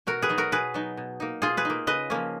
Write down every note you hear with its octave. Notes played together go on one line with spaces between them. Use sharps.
B2 F#4 A#4
G#4 B4
F#3 B3 D#4
F#4 A#4
B2 G#4 B4
F#3 B3 D#4
B2
A#3 D#4
B2 F4 G#4
G#4 B4
A#3 D#4
C#3 B4 D#5
F3 A#3 C#4